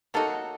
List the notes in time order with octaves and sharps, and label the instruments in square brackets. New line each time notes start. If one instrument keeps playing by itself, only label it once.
[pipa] F#3 A#3 D#4 F#4 [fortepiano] A4